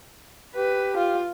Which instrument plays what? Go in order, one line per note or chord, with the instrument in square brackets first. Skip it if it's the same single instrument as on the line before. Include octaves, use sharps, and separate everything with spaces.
[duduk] G4 [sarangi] B4
[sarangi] F4